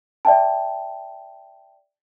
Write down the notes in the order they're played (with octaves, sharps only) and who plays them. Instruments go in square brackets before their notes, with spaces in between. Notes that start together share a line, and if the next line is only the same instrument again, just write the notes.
[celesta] D5 E5 G5 A5